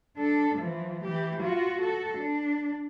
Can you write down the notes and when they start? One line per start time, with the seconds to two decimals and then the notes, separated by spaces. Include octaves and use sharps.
0.18 D4 A4
0.58 E3 F3
1.04 E3 G4
1.41 F4 F#4
1.80 F#4 A4
2.17 D4